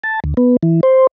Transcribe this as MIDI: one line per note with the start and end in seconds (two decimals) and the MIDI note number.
0.04 0.20 81
0.24 0.34 38
0.37 0.57 59
0.63 0.81 52
0.83 1.07 72